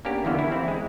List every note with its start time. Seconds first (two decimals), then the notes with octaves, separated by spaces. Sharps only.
0.05 A#3 B3 C#4 D4 G4
0.25 E2 D3 E3 A#3 B3
0.39 E4
0.52 C4 E4
0.68 G#3